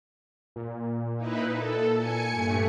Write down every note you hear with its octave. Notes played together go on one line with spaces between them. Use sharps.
A#2
D#4 E4 B4
A4
G#5 C#7
G2 A3